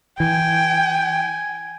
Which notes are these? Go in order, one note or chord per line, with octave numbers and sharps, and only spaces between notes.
E3 G5 G#5